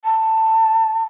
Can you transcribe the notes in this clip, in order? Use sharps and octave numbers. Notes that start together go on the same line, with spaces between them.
A5